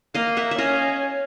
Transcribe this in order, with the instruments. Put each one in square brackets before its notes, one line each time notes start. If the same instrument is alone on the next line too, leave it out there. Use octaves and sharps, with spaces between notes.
[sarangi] A#3 [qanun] D#5 F5
[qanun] E5 F#5
E5
[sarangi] C#4 [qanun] D#5 F5